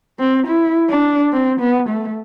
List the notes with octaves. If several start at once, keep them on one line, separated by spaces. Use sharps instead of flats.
C4
E4
D4
C4
B3
A3